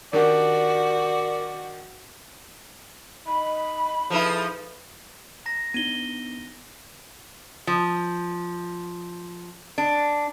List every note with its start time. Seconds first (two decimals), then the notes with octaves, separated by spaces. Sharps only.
0.13 D#3 D4 F#4 G4 A#4 D5
3.27 D#4 D#5 B5
4.10 F3 D#4 E4 G#4 A4 B4
5.46 A#5 A#6
5.74 B3 D4 D#4 D#7 G7
7.67 F3
9.78 D4